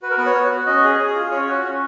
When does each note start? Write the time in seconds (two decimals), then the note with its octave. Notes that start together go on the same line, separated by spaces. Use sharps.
0.02 F#4 B4
0.10 A#4
0.18 B3 B4
0.26 C#5
0.35 F#4
0.51 F#4
0.66 C#4 D#5
0.84 G#4
0.99 G#4
1.15 F4
1.31 C#4 C#5
1.47 F#4
1.64 C#4